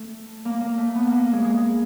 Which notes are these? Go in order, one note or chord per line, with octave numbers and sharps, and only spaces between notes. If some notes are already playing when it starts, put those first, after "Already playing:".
Already playing: A3
A#3
A#3
A3
B3
A#3
G#3
G#3